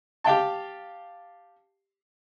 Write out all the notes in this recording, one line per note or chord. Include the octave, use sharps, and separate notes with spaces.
G4 F5 G5 A5